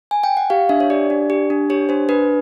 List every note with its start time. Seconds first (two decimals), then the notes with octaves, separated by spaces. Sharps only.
0.11 G#5
0.24 G5
0.37 F#5
0.50 G4 F5
0.69 D4 E5
0.80 C#5
0.90 G4 D5
1.10 D4
1.30 G4
1.50 D4
1.70 G4 C#5
1.89 D4 C5
2.09 D4 B4